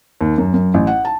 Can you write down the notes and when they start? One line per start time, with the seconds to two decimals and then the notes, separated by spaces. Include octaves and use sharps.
0.21 D#2
0.38 F#2
0.54 F#2
0.74 A1
0.87 F#5
1.05 A5